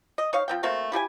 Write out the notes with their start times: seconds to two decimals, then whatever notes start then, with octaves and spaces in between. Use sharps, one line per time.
0.18 D#5
0.33 D#4 C#5 F5
0.48 F3 C4 G5
0.63 A3 A#3 C4 F#4
0.92 E4 G4 A4 G#5